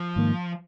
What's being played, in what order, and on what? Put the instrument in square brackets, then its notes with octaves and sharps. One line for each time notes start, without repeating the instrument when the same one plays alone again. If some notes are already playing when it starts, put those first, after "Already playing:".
Already playing: [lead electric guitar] F3
[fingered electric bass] G#2 D#3 A#3